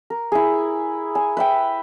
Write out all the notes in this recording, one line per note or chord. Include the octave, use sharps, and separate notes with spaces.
A#4
E4 G#4
G#5
B4 E5 G5